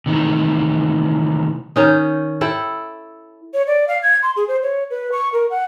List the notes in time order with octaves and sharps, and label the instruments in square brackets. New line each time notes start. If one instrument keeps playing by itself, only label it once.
[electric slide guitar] C3 D#3 E3 A3
[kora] D#3 C#4 D#4
E4 A4 G5
[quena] C#5
D5
F5
G#6
C6
G#4
C5
C#5
B4
C#6
A#4
F#5